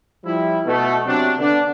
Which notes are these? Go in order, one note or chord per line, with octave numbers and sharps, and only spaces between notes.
F3 G3 E4
B2 A3
C3 F#3 C4 D4
D3 B3 D4